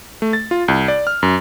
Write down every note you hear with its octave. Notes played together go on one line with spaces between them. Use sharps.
A3
A6
F4
C2
D5
F6
F#2